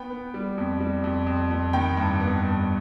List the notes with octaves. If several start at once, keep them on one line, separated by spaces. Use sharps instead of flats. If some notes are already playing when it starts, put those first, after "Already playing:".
Already playing: B3 G5 B5
B3
G3
F2
G3
F2
F2
F2
D#3 G5 B5
G2
B3
G2